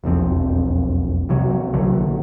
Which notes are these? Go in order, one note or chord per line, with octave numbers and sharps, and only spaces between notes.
E1 B1 F2 C4
C2 C3 F#3
A#1 D3 F#3